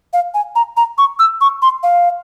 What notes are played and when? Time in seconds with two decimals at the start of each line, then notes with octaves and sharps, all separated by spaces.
0.13 F5
0.34 G#5
0.56 A#5
0.77 A#5
0.98 C#6
1.19 E6
1.41 C#6
1.62 C6
1.83 F5